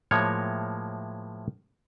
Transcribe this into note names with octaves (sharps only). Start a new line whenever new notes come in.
A2 F3 G#3 A#3 C#5